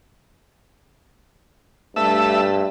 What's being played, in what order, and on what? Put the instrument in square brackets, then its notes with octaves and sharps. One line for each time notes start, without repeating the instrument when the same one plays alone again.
[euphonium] G2 [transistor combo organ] A3 E5